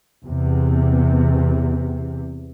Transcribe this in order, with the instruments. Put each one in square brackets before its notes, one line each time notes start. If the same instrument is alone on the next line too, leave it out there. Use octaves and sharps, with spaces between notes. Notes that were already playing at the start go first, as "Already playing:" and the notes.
[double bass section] E2 C3